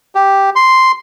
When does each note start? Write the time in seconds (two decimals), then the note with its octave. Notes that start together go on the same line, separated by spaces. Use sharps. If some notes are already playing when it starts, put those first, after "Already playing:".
0.15 G4
0.56 C6